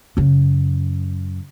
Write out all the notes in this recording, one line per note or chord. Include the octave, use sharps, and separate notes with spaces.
F#2 C#3